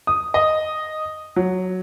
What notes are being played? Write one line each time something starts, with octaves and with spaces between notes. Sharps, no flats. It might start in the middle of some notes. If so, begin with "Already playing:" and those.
D#6
D#5
F#3